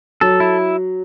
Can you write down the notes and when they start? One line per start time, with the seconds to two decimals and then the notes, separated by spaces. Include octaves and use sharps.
0.21 F#3 A4
0.40 E4